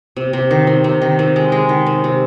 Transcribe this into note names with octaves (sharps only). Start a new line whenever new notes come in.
C3
C3
D#3
C3
C3
D#3
C3
G#3
G#3
D#3
C3
C3